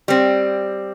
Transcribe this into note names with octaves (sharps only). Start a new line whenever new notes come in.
G3 C4